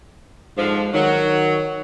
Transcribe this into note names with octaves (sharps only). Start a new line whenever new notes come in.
G#2 D3 F3
D#3 F#3